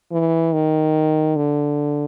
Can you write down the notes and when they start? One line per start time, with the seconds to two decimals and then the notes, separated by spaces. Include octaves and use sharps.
0.11 E3
0.53 D#3
1.36 D3